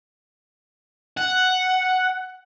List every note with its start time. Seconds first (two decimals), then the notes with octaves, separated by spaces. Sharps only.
1.17 F#5